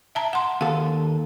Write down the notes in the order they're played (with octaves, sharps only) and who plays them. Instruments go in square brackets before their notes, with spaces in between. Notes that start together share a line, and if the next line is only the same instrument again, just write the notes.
[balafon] E5 A5 A#5
F#5 C6
[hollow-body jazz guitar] D#2 A4 [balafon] F5